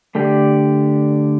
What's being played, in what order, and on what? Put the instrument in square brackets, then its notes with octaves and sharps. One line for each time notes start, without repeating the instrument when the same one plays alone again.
[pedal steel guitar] D3 A3 G4 D5